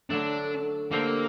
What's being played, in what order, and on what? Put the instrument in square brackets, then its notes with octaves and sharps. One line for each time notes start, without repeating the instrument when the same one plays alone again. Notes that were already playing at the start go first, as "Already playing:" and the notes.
[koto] D3 F#3 A3 [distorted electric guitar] D4
[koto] D3 A3 C4 G4 [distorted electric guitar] A#3